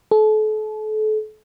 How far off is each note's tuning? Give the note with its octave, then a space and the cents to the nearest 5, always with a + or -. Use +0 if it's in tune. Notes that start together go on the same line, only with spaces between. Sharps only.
A4 -35